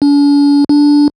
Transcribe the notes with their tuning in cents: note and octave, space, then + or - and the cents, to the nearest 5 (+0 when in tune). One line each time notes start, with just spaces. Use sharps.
D4 -45
D4 -10